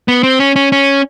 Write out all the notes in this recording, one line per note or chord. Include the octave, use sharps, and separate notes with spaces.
B3
C4
C#4
C#4
C#4